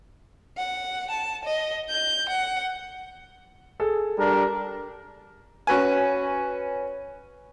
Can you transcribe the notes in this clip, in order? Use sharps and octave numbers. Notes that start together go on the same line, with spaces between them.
F#5
A5
D#5
G6
F#5
G#4 A4
G3 D4 A#4
C#4 F#4 B4 G#5